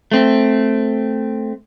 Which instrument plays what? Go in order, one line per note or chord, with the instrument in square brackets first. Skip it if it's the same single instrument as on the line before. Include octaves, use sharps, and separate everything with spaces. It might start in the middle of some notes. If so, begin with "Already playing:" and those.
[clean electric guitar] A3 C4